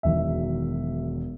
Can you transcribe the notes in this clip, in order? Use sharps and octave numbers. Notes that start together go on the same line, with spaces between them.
E1 E2 D#3 F#3 E5